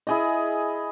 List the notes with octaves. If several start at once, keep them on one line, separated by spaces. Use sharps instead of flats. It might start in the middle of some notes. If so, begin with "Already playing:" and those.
E4 G#4 D#5